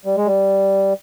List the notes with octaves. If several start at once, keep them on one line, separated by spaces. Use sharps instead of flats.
G3
G#3
G3